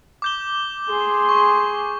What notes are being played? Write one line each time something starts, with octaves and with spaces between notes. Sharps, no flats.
D6 G6 G7
G#4 C6
C#6